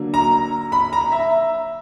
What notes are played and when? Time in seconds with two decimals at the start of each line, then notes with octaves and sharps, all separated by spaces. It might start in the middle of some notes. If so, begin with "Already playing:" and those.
Already playing: D3 F#3 A#3
0.14 A#5
0.72 B5
0.93 A#5
1.12 E5